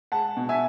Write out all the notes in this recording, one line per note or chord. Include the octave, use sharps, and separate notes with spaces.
G#3 F#5 A5
B2
E5 G#5